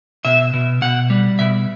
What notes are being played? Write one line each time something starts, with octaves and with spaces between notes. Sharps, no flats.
B2 E5
B2
B2 F#5
G3
B2 E5